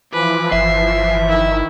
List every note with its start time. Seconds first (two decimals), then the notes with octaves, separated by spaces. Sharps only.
0.13 E3 F3 B4 D6
0.52 G1 E5 C7
1.29 D#3 E4